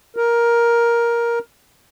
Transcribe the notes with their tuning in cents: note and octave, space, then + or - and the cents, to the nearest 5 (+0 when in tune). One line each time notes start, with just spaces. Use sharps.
A#4 +10